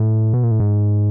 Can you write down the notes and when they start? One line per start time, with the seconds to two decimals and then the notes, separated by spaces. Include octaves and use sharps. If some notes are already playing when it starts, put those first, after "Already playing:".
Already playing: A2
0.33 B2
0.43 A#2
0.51 A2
0.60 G#2